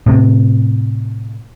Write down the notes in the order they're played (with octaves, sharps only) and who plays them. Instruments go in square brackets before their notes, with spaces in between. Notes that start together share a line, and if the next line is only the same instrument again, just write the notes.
[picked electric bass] A2 C3